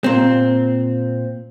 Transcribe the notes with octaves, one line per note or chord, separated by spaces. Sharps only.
A#2 C4